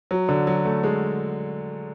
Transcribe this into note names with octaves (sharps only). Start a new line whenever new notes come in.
F#3
D3
F#3
A3
G#3